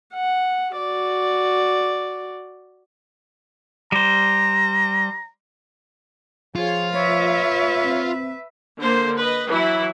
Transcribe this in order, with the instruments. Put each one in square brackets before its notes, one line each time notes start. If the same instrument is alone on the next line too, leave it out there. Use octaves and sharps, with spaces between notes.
[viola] F#5
F#4 D5
[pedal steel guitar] G3 C5 [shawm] A#5
[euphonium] F3 [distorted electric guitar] F4 [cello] G#4 C#5
[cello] B4 E5 [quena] C#5
[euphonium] C4
[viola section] D3 A#3 C5
B4 D#5
E3 F#3 E4